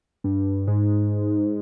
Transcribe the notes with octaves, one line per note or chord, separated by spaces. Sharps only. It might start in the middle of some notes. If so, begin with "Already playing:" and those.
G2
G#2